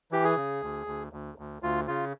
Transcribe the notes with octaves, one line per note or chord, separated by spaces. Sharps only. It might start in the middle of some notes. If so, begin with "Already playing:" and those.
E3 G4
G#4
C#3
D2
D2
D2
D2
D2 F4
C#3 F4